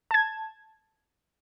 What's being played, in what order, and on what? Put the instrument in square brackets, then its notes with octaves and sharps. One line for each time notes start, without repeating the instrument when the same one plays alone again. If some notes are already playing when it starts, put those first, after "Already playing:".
[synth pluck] A5 G#6